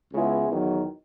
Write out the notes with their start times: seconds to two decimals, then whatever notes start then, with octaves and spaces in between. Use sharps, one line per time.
0.13 C#2 C#3 G#3 B3 E4
0.48 E2 D#3 F#3